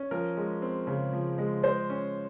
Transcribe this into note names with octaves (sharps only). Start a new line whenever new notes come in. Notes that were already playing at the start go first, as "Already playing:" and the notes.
Already playing: C#4
F3 A#4
G#3
C4
C#3
F3
G#3
G#3 C5
C#4